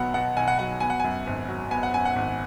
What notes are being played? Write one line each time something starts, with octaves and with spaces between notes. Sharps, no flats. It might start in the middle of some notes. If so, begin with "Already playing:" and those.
Already playing: B1 B2 F#3 B3 F#5
B2 F#5
B1 G#5
F#5
F#3 F#5
B3 G#5
F#5
F#2 G#5
G#1
F#3
B3 G#5
F#5
F#2 G#5
F#5
G#1